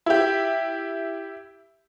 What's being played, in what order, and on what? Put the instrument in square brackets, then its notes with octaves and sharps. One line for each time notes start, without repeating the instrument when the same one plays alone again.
[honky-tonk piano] E4 G4